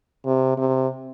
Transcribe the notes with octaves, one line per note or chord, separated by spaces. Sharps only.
C3
C3